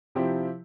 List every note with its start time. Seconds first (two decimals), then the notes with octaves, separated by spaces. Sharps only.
0.15 C3 F3 C4 E4 G4